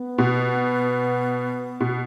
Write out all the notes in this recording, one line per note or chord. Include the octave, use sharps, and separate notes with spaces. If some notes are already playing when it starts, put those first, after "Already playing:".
Already playing: B3
B2
B2